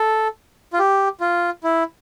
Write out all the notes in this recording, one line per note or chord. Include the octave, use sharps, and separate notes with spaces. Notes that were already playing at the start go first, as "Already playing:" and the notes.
Already playing: A4
F4
G4
F4
E4